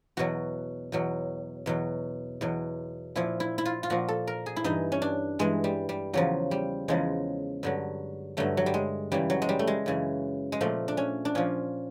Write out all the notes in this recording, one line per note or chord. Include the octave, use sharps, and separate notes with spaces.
E2 B2 F#3 F#4
E2 B2 F#3
E2 B2 F#3
E2 B2 F#3
A#2 F3 E4
E4
E4
F4
F4
A#2 F3 F#4
A4
A#4
G#4
E4
G2 E3 D#4
C#4
D4
G2 E3 G#3
G3
G3
E2 C#3 F3 F#3
G3
E2 C#3 F3 G#3
G2 D3 F#3
G2 D3 F#3 A3
F#3
G3
G#3
F#2 C#3 E3 G3
F#3
G#3
G3
A3
G#3
F#2 C#3 E3
G#3
A#2 F3 A3
D4
C#4
D4
A#2 F3 C#4